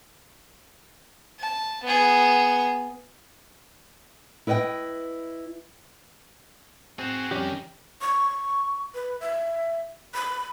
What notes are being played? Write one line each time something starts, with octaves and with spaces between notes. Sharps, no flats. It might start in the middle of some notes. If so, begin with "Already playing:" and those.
A5
B3 G#4
E4 B4 D#5 F#5 G5
C4 F#4 G#4 C5
F2 D#3 G3 C#4 D#4 G4
C#6
B4
E5
B5